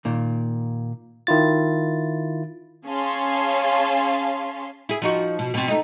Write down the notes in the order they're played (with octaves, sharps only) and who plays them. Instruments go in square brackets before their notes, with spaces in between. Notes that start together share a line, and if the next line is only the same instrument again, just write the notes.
[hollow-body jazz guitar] A#2 D#3
[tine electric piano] D#3 E4 F4 A6
[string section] C#4 G#4 C#5 F5 A5 C6
[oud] E4 G#4
F3 D#4 F#4
B2
B2 C4
A3 D#4